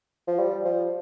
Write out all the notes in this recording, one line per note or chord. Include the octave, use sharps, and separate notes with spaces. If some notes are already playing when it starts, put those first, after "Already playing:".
F3
G3
F3